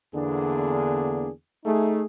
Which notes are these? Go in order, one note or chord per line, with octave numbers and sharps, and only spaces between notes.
E2 D3 A#3 B3 D4 G#4
A3 D#4 G#4